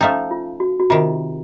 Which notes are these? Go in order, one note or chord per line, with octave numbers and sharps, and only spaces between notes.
F3 A3 C#4 D#4
F4
F#4
F#4
C3 D#3 F4